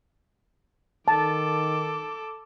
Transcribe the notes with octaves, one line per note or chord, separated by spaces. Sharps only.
D#3 A4 A5 D6